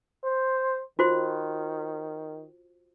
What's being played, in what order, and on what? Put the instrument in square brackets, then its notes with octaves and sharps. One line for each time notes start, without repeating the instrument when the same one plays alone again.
[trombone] C5
[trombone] D#3 [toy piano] F4 F#4 C5